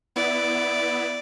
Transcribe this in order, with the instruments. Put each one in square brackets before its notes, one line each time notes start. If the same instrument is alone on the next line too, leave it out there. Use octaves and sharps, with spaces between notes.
[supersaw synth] B3 E4 [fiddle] D5